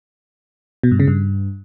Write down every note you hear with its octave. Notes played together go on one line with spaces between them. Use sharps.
B2
G2
C#3
G2